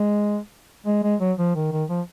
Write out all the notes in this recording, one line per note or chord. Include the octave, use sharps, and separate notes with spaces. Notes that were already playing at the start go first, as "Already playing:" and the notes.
Already playing: G#3
G#3
G#3
F#3
F3
D#3
D#3
F3